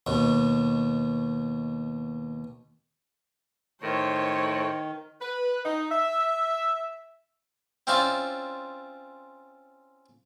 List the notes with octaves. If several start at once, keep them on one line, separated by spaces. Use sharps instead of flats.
D#2 B2
A2 D#3 C5 C#5
B4
D#4
E5
C4 C#4 E4 F4 D5